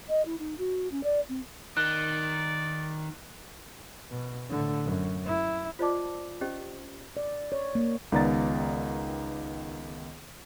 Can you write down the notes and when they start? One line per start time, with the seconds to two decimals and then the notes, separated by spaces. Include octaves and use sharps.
0.09 D#5
0.25 E4
0.39 D#4
0.58 F#4
0.91 C#4
1.04 D5
1.28 C4
1.77 D#3 D5 F#6
4.11 B2
4.49 A2 D3
4.85 F#2
5.25 E4
5.79 F4 C5 D5 D#5 A5 D6
6.41 C#4 G4 C5 D#5
7.17 D5
7.52 C#5
7.75 A#3
8.12 C#2 D#3 B3 D5 A#5 A6